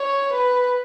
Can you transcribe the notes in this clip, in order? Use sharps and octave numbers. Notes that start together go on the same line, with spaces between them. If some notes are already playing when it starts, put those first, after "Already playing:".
Already playing: C#5
B4